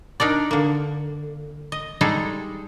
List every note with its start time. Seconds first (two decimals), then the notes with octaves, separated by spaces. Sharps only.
0.20 D4 D#4 A#4 D5
0.51 D3 A#3
1.72 D#5
2.01 G3 G#3 D#4 G#4 A4